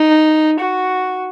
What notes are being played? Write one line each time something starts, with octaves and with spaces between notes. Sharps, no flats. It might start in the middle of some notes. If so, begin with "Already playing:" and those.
Already playing: D#4
F#4